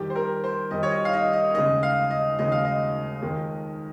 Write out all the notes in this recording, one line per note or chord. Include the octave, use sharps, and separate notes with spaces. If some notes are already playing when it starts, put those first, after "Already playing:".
Already playing: F2 D#3 G3 G4
C5
A#4
C5
F2 D#3 G3 D#5
C#5
D#5
F5
D#5
D#5
D#2 C#3 G#3 D#5
F5
D#5
D#2 C#3 G#3 D#5
F5
D#5
F2 D#3 G#3